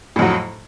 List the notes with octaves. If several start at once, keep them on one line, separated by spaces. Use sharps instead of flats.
F2 A2 F#3